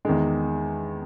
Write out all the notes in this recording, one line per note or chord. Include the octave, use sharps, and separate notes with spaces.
E2 D#3 G#3